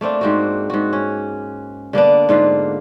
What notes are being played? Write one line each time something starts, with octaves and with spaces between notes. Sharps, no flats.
A3 A#3 C4 D4
G#2 C4 F#4
G#2 F#4
C#4
D3 A#3 B3 D4
G#2 D3 F4 F5